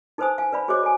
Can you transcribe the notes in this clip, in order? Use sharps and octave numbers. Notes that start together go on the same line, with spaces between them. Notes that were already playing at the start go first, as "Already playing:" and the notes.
D#4 A4 B4 C5 G#5 D#6
F5 G#5
B4 D5 F5 B5
F#4 G#4 C5 C#5 D#5 D6
A4 G#5